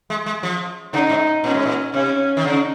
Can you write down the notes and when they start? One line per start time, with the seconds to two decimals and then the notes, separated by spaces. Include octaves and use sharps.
0.10 G#3
0.26 G#3
0.43 F3
0.93 C#3 D#4
1.09 G#2
1.44 A#2 C#4
1.54 G#2
1.66 A#2
1.93 C3 C#4
2.37 D#3
2.43 C#3 D#4